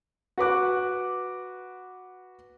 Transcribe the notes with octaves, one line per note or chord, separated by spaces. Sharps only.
F#4 B4 D6 F#6